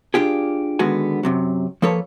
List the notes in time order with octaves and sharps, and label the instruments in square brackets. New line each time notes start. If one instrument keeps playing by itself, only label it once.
[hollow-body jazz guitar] D4 F4 G4 G#4
D3 D#3 G#3 B3 F#4 G#5
F#2 C3 F#3
F3 A#3 A4 B4 C#5